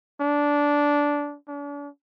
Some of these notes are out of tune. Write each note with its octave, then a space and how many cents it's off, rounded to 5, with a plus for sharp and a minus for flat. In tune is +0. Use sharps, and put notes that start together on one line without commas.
D4 -15
D4 -40